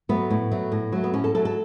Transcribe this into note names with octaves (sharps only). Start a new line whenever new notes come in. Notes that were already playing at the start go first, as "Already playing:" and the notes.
F#3 A3 B3
A2
F#3 A3
A2
F#3 A3
B3
A2 C#4
A4
F#3 A3 A4
A4